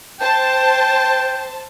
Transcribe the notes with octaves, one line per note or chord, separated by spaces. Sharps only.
C5 G5 A5